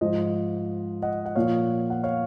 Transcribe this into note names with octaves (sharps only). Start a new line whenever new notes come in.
G#2 F3 C5 D#5
D#5 F#5
F#5
A#2 F3 C#5 F5
F#5
C#5 F5